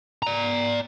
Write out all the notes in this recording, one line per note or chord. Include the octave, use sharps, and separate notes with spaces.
D5 A#5